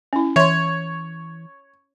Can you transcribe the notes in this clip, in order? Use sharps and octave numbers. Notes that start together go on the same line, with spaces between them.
C#4 E4
E3 C#5 E5 C6